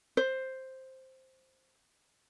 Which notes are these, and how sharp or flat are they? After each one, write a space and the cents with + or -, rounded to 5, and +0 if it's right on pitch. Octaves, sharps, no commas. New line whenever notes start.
C5 +5